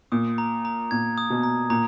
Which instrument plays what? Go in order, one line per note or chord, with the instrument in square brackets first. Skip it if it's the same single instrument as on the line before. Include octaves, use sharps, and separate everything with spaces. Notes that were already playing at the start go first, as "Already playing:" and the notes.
[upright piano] A#2 [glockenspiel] D#6
[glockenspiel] A#5
A#5
[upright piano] A#2 [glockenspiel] G#6
[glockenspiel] D#6
[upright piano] B2
[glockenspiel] A#5
[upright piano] A#2 [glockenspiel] A#5